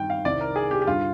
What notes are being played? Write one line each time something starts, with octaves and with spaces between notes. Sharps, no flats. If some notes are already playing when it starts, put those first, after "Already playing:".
Already playing: G2 D#3 G5
F5
C2 C3 D#3 D5
A#4
G#4
G4
G4
G2 D3 F4